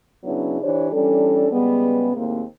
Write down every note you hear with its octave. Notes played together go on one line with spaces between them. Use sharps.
C#3 F#3 B3 C#4 D4 E4
E3 D4 G4 C5 C#5
E3 G3 C#4 D4 A4
C#3 G3 G#3 B3
D#2 A2 G#3 A#3 C4